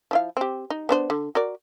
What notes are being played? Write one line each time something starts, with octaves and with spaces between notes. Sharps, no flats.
F3 E4 F5
C4 G4
D#4
B3 D4 C5
D3
F#4 A#4 D5